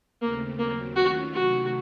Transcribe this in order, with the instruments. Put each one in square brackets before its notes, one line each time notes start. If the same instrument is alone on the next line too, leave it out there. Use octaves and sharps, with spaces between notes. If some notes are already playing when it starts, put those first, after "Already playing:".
[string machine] D#2 C#3 A3 C4 [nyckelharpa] A#3
[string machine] D#2 C#3 F#3 C4 [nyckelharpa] A#3
[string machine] D#3 A3 C#4 F4 [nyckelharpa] F#4
[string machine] C3 D#3 F#3 A3 [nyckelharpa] F#4